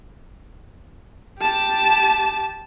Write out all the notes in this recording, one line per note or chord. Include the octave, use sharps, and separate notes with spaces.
G4 A5